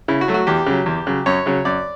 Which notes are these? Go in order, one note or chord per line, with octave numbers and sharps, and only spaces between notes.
C#3 E4
F#4
F#3 A3
F#4
E2 G4
C#3 F#3
E2
C#3 F#3
F#2 C#5
C#3 F#3
F#2 D5